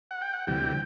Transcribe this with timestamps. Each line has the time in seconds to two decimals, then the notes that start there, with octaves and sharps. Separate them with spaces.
0.11 F#5
0.22 G5
0.33 F#5
0.47 D2 C3 E3 G3 G5